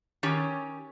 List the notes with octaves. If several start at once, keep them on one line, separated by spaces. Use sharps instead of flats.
D#3 C#4 G4